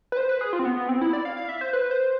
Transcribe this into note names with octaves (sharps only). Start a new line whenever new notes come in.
B4
C5
B4
G#4
F4
C4
B3
B3
C4
E4
D5
F5
F5
E5
C5
B4
C5